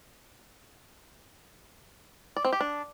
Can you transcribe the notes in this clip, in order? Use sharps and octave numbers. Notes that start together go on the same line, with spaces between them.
D5
C4
G4
D4